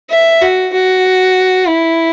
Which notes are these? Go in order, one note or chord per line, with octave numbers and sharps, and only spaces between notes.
E5
F#4
F#4
E4